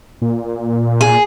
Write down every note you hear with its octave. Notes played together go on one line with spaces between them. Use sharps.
A#2
G#4